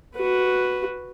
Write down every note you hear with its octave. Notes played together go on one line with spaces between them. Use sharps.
F#4 B4